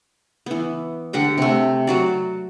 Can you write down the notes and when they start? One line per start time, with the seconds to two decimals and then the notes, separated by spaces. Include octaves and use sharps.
0.46 E3 B3
1.13 D3 G4 F#5 G5
1.38 C3 A3
1.87 F#3 F#4 D5